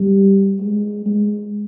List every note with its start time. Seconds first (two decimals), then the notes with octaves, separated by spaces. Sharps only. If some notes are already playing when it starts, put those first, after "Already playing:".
Already playing: G3
0.60 G#3
1.06 G#3